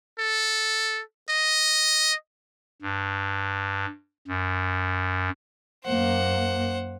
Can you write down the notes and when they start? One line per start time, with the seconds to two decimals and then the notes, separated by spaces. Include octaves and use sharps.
0.19 A4
1.30 D#5
2.82 G2
4.28 F#2
5.84 F#2 A#3 C5 F#5